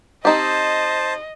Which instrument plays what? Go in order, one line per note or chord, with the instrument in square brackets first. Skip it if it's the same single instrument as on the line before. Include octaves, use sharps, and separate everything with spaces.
[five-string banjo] C4 D#4 G4 [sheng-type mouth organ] C5 A5 [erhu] D#5